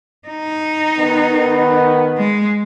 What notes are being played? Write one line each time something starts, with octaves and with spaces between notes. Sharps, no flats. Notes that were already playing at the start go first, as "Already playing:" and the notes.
D#4
D#3 B3
G#3